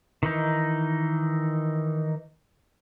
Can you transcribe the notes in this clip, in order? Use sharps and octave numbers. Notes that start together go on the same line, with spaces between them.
D#3 E3 D#4